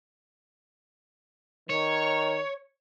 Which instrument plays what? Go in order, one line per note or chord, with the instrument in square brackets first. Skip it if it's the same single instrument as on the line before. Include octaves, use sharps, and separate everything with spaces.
[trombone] D#3 [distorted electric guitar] C#5